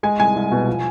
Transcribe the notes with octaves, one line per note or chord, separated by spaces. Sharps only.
G#3 G#5
C2 G#5
C2
B2
F3